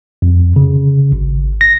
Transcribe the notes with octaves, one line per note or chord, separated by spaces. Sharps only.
F2
C#3
G#1
A#6